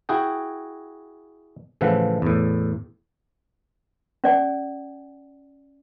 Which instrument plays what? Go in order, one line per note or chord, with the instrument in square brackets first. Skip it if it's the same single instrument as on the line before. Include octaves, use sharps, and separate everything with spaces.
[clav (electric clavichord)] E4 F#4 G#4 G5
A2 C#3 E3 F3 E5 F#5
E2 A2
[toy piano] C#4 D5 G#5